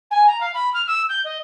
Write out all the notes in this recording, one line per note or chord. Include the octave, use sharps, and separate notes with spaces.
G#5
A#5
F5
B5
F6
E6
G6
D#5